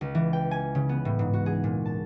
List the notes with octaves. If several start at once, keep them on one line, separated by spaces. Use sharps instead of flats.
C#2
E3
G5
G#5
C#3
B3
A2
G#2
F#4
G#4
A#2
A5